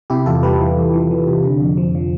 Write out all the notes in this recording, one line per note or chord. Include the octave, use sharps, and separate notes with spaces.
C3 E4 G4
E2 F4 A4
G3 G4 B4
E3
E2
E3
E3
C3
D3
F2
F3
F3